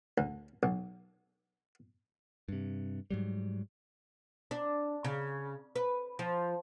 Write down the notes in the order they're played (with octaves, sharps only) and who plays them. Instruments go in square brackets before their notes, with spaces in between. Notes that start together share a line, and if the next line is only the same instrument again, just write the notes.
[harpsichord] D2
B1
[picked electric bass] G2 C3
G#2 F#3 G3
[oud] D4
C#3
B4
F3